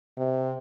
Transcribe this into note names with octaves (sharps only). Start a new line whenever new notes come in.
C3